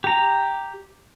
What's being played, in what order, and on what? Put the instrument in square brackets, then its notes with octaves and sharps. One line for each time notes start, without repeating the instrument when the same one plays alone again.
[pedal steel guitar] G4 A#5